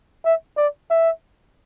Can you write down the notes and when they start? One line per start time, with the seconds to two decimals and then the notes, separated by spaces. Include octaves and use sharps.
0.24 E5
0.57 D5
0.90 E5